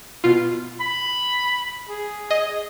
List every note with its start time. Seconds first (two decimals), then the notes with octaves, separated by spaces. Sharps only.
0.24 B2 F4
0.80 B5
1.87 G#4
2.31 D#5